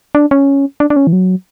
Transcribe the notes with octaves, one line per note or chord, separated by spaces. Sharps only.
D4
C#4
D4
D4
C#4
E3
F#3